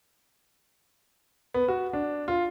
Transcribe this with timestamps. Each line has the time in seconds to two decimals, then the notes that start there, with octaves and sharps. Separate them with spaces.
1.54 B3
1.68 F#4
1.93 D4
2.28 F4